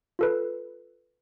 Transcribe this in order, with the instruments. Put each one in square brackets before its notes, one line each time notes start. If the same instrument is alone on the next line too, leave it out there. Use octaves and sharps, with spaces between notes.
[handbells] F4 A4 B4